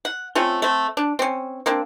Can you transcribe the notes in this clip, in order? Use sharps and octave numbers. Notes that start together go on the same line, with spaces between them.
F#5
A3 C4 C#4 F4
A3 C4
D4
C4 C#4
A#3 C4 D4